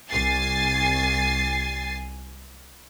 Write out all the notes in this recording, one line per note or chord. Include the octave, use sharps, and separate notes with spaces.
C2 G#5 A6 C7